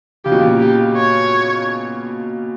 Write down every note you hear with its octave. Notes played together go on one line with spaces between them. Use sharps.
C#3 G4
B2
A#2 C#3
G4
C#5